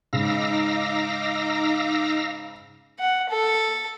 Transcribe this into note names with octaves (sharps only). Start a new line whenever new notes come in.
G#2 C#3 D#4 F5 A#5 D6 E6 A#6
F#5
A4